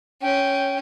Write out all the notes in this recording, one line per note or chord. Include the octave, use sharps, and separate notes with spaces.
C#4 G5